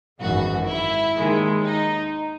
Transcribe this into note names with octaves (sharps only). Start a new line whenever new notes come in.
G#1 F#2 E3 F#4
E4
D#2 D#3 G#3
D#4